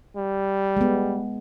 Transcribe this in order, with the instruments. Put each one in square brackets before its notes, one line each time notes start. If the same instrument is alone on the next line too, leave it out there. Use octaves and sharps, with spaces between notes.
[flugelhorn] G3
[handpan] G#3 B3